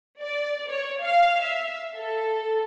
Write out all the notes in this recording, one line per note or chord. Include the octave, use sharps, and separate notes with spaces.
D5
C#5
F5
E5
A4